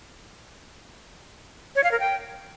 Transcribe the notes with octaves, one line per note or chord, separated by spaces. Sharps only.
C#5
F5
A#4
G5